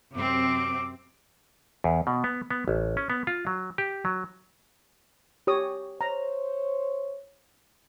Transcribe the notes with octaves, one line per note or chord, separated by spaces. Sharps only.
F#2 C3 C4 D6
E2
B2
B3
B3
A1
C#4
B3
F4
F#3
G4
F#3
G4 C#5 D#6
C5 C#5 A#5